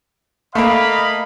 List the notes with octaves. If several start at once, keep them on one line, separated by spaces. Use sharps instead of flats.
A3 A#3 D#5 F5 B5